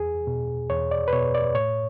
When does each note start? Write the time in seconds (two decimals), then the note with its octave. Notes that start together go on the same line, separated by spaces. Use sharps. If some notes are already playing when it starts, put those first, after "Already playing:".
Already playing: E2 G#4
0.27 B2
0.70 E2 C#5
0.91 D5
1.08 B4
1.13 B2 C#5
1.35 D5
1.55 A2 C#5